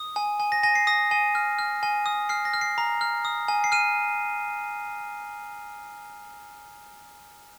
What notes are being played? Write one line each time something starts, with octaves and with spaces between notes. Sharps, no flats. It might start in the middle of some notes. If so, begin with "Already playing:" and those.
Already playing: D#6
G#5
G#5
A#6
G#5 A#6
C7
D#6 A#6
G#5
F6
F6
G#5
D#6
F6 C7
A#6
F6
C7
A#5
F6
D#6
G#5
C7
F6 D#7